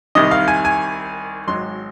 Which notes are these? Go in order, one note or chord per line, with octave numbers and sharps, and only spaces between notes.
C2 C3 D#3 D#5
F5
G#5
G#5
G#1 G#2 F#3 C6